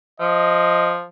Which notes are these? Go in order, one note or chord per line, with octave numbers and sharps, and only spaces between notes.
F3 D#5